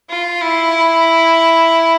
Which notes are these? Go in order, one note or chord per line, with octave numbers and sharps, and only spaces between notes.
F4
E4